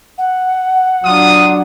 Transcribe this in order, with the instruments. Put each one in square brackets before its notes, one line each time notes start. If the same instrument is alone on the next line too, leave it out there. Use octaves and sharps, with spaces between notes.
[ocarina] F#5
[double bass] F#3 D4 [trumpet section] F4 D#6